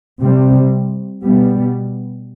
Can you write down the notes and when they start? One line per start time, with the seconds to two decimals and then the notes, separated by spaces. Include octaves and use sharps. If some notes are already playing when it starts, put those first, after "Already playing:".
0.21 C3 G3 C4
1.24 B2 G3 B3